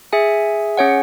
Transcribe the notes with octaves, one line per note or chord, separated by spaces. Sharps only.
G#4 E5 G#5
C#4 G#4 C#5 F#5